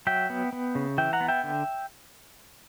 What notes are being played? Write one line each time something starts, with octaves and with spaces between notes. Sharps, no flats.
F#3 E5 G5
B3
B3
C#3
E3 E5 G5
F#5 A#5
B3
E5 G5
D3